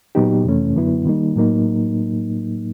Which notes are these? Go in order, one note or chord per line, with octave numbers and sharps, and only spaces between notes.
A#2 F#3 B3 D#4 G4
F2 C3 E3 A3 C#4
F#2 D3 F#3 B3 E4
D#3 G3 A#3 D#4
A2 F#3 A#3 D#4